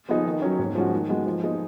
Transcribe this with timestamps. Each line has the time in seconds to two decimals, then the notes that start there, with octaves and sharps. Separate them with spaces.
0.09 F3 B3 D#4 G#4
0.26 D#3
0.42 F#3 C#4
0.59 G#2
0.75 F3 G#3 C#4 F#4
0.92 D#3
1.09 G#3 B3 F#4
1.27 F3
1.43 B3 D#4 G#4